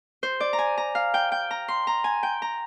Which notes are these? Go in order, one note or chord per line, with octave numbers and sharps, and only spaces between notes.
C5
D5
A#5
G#5
A#5
F5
G5
G5
A#5
C6
A#5
G#5
G5
A#5